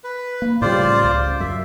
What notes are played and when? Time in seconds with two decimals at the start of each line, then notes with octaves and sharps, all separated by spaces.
0.04 B4
0.42 A#3
0.62 A2 C#3 G3 F4 C5 D5
1.04 C#2
1.40 F#2 E5